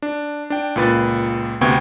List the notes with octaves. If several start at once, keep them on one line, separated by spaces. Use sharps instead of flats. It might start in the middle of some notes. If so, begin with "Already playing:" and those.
D4
D4 G5
C#2 A#2 B4 A6
D2 C3 B3 G5 C#6 G#6